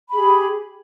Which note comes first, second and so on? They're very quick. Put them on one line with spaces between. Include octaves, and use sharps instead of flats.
B5 G#4 G4